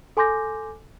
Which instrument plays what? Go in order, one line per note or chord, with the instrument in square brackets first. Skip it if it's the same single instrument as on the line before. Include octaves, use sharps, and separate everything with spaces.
[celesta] A4 G#5 C6 D6 G6 A#6